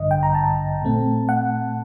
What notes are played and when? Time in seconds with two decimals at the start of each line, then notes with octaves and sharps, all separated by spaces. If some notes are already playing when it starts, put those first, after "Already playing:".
Already playing: A1 G2 D3 D#5
0.11 G5
0.23 A#5
0.35 A5
0.82 A#2 A3 C4
1.29 F#5